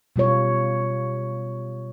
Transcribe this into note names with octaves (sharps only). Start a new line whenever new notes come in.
B2 G3 F4 C#5